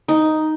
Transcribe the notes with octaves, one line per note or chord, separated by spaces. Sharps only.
D#4